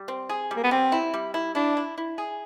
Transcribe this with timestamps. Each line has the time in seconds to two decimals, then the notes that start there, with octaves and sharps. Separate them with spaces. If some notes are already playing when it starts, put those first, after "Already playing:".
Already playing: G3
0.08 C4
0.29 G#4
0.51 G3
0.56 A#3
0.64 B3
0.71 G3 C4
0.92 E4
1.14 G3
1.34 E4
1.55 D4 E4
1.77 E4
1.98 E4
2.18 G#4